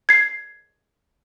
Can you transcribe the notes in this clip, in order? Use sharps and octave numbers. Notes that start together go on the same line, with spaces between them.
G#6 C7